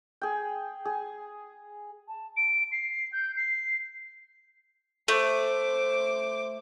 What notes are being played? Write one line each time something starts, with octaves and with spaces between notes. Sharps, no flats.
G#4 G5
G#4
A5
D7
C7
G6
C7
A3 C5 D6